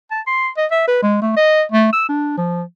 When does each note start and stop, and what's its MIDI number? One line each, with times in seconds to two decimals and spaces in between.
0.11 0.21 81
0.27 0.48 84
0.57 0.66 75
0.71 0.84 76
0.88 1.01 71
1.02 1.20 56
1.21 1.35 57
1.36 1.62 75
1.72 1.88 57
1.93 2.06 88
2.09 2.36 62
2.38 2.63 53